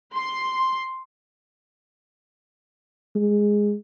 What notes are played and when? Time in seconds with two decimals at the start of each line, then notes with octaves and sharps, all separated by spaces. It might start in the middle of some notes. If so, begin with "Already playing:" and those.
0.15 C6
3.15 G#3